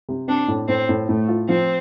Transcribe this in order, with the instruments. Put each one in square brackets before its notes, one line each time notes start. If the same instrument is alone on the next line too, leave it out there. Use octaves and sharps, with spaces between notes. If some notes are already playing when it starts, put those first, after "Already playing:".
[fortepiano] C3
[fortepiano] C4 [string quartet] D4
[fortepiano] A2
[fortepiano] A2 [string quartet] C4
[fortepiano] A2
[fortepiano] A2 [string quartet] A3
[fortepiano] F4
[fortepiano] F3 [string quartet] C4